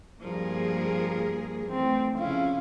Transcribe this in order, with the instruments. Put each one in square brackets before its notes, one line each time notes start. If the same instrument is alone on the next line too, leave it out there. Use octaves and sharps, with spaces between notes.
[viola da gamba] G2 F3 [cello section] A#3 G#4 A#4
[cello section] E3 A3 [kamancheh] C4
[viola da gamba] F2 C#4 E4 [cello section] C#3 [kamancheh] F4 F5